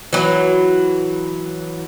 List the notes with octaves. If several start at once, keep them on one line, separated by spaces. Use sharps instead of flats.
E3 F#3